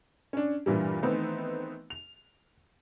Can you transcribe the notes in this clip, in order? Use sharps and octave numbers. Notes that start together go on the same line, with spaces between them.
C#4 D4
G2 A#2 E3 G3
D#3 E3 A3 B3 C4 D#4
F7